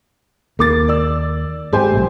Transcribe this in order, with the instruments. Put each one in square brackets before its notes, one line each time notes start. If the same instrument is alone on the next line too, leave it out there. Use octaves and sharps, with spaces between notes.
[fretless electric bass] D#2 [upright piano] A#3 D6 A6
[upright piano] D5 E6
[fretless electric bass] G#2 C4 [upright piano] G4 C5 G#5
[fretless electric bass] B1 F3 A3